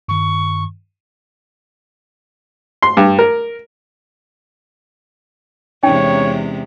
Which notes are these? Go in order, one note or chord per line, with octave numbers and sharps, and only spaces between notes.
G2 D#3 C#6
C6
G2
A#4
E2 C3 G#3 C#4 D#4 C#5 G5